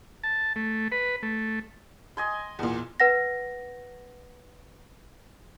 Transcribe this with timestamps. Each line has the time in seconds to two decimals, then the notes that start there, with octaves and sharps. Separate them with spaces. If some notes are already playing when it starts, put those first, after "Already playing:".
0.24 A5
0.56 A3
0.92 B4
1.23 A3
2.17 D#5 G#5 C6
2.59 E2 A#2
3.00 B4 F#5 A#6